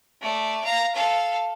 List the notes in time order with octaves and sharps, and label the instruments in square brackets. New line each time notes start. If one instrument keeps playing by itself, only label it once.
[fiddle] A3 D5
F5 A#5
A4 F5